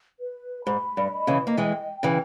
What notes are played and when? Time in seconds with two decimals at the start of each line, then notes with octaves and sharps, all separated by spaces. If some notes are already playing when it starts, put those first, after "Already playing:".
0.20 B4
0.65 G#2 B5
0.97 G2
1.12 D#5
1.27 C#3 E3
1.47 A#3
1.57 E3 G#3 G5
2.03 C#3 E3 B4